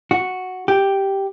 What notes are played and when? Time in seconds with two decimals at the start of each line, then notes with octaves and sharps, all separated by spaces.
0.11 F#4
0.68 G4